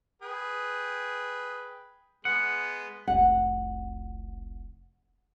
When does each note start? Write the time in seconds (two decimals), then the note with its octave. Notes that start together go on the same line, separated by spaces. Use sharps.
0.22 G#4 B4 G5
2.25 G#3 B3 F#5
3.08 F1 C2 F#5